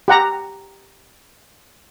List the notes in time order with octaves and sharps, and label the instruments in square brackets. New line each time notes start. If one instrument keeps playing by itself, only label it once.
[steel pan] G4 F#5 A#5